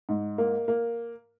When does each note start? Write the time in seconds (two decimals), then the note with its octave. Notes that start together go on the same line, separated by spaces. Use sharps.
0.09 G#2
0.38 A#3
0.68 A#3